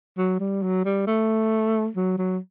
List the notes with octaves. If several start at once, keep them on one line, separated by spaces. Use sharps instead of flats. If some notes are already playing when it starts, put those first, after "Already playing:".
F#3
G3
F#3
G3
A3
F#3
F#3